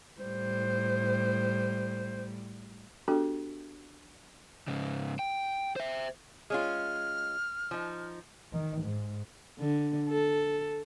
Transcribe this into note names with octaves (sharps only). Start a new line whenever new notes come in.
A2 G3 C5
B3 D4 F#4 G4 A4
G#2 C#3
G5
C5 E5
G#3 C#4 F4 F6
F3 D#4
D#3
G#2
D3
A4